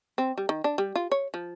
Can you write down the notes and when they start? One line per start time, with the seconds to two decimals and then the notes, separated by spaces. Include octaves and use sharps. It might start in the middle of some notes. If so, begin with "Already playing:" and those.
0.18 C4
0.38 G3
0.49 D#3
0.64 D4
0.78 G3
0.95 F4
1.11 C#5
1.34 F3